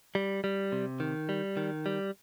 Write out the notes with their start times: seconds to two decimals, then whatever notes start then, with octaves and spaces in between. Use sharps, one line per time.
0.15 G3
0.44 G3
0.72 C3
1.00 D#3
1.29 G3
1.57 D#3
1.86 G3